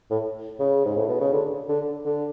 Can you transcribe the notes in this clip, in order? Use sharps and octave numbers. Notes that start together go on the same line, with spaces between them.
A2
C#3
G#2
A2
B2
C#3
D3
D3
D3